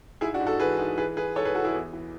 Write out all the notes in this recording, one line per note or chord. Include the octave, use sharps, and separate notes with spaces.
G#2 E4 G#4
D4 F#4
G#2
F#4 A4
E3 G#4 B4
G#2
E3 G#4 B4
E3 G#4 B4
G#2 A4 C#5
G#4 B4
E3 F#4 A4
E4 G#4
E2
E3